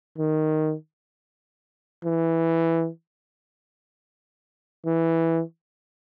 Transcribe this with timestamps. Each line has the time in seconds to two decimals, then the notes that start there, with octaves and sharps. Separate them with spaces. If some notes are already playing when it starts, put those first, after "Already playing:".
0.18 D#3
2.04 E3
4.86 E3